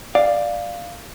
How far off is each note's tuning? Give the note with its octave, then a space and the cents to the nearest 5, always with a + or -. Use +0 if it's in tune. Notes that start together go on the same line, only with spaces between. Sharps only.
D5 +10 F5 +0